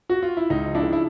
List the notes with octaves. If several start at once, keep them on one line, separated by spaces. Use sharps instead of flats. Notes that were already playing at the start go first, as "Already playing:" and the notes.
F#4
F4
E4
C#2 D#4
F3
D4 E4
C#3
E4